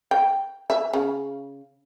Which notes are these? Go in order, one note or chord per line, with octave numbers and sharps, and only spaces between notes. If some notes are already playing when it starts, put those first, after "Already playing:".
G5
E5
C#3